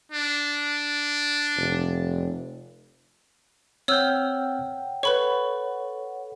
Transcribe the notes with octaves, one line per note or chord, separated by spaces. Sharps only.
D4
F1
C4 C#5 F#5 G5 E6 F6 G6
A4 B4 C#5 F#5 B5 C#6